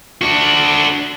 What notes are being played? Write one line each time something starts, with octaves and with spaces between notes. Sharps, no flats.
D4 F#4